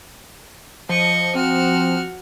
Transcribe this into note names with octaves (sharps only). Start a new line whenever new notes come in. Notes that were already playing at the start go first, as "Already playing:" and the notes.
F3 D#5 C#6
C4 F#4 F6